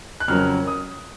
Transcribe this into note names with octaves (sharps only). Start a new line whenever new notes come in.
F#6
F2 C#3 F#3 A#3 C#4 F6
D#6